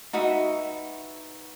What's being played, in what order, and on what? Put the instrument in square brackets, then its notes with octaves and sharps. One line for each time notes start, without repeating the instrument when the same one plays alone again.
[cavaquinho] D#4 F#4 B4 E5